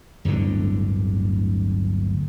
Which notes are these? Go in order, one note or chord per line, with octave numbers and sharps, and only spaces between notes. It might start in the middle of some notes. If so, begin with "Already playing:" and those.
D1 G1 A2 D3